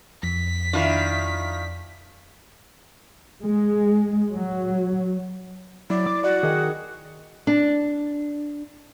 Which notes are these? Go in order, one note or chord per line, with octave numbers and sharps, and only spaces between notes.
F2 B6
D#3 D4 E4 F4
G#3
F#3
F#3 E4 D5
D6
F#4 D5
D#3 G#4 D#5 G5
D4